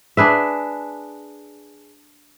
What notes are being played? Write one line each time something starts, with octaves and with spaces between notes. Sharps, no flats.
D4 G#4 B4 E5